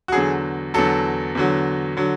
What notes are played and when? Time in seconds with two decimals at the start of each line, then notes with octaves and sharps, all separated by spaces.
0.08 F#4
0.12 E2 D3 F#3 G#4
0.74 E2 D3 F#3 A4
1.35 E2 D3 F#3
1.97 D3 F#3